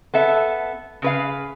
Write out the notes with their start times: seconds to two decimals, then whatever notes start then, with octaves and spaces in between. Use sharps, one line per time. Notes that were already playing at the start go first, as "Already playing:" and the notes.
0.14 B3 A4 E5
1.02 C#3 B4 F5